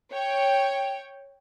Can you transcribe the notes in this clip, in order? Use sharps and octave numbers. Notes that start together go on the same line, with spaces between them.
C#5 G5